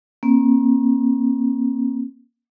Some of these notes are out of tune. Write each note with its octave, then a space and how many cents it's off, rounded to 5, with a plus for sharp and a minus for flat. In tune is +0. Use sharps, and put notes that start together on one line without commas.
A#3 +20 C#4 -45